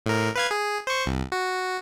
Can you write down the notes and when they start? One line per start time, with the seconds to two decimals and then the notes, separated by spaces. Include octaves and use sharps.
0.06 A2 A#4
0.36 B4 F5 G#6
0.51 G#4
0.87 C5 C#6
1.06 C2
1.32 F#4